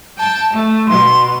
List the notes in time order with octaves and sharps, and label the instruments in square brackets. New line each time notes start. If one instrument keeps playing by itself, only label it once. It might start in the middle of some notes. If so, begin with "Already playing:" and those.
[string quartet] G5 A5
A3
[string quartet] B2 [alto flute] C6